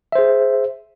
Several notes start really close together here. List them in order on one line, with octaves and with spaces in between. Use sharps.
E5 C5 G#4